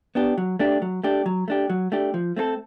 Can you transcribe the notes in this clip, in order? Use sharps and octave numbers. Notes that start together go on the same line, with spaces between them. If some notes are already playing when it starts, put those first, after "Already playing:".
B3 D4 G4
F#3
A3 D4 G4
F#3
A3 D4 G4
F#3
A3 D4 G4
F#3
A3 D4 G4
F3
A3 C4 F4 A4